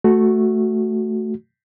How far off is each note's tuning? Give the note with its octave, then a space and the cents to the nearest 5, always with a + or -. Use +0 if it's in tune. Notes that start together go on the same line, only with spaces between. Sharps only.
A3 +0 F#4 +0